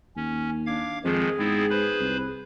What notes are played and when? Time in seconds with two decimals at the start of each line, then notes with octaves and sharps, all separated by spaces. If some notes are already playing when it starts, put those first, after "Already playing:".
0.16 D#2 C#4
0.66 D4 F5 D6 G#6
1.04 F2 D#3 F3 G#3 G#4
1.39 G#2 B3 C4 E4
1.70 B4 C5 B5
2.00 C2